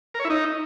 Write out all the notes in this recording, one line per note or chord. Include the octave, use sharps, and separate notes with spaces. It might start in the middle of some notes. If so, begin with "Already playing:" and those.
A#4
C#5
E4
D#4